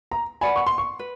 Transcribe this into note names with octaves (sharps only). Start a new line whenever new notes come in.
A#5
B4 D5 F#5 G#5 B5
C#6
C6
C#6
B4